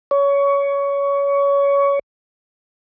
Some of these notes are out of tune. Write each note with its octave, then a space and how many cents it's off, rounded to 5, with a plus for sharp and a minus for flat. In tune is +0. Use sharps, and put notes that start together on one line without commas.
C#5 +20